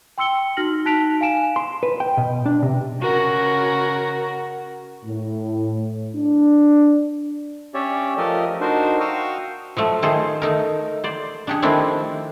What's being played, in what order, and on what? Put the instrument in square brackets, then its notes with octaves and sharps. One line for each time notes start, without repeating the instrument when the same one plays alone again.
[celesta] G5 C6 E6 C#7 G7
D#4 F#4 F6 A#6 F#7
D#4 A5 F#6 B6 D7 F7
F5 G#5 D7 E7
[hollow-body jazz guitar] C6
B4
G5
B2
D4
C3
[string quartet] C#3 F#4 A#4 F#5
[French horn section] A2
D4
[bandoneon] C#4 G4 C#5 D5 E5
F3 A3 G4 A4 A#4 D#5
D4 D#4 F#4 A#4 C5
F#4 F5 G5 C#6 D#6 E6
[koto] F3 F#3 A3
D#3 A3 F4 G#4 C5
A3 D#4 A#4
C5 D5
D4 G4 G#4
D#3 F3 A3 C4 D4 E4